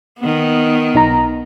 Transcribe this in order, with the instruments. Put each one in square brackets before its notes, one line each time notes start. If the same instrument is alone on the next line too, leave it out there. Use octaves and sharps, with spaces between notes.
[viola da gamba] D#3 B3
[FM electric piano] B1 D#4 A#5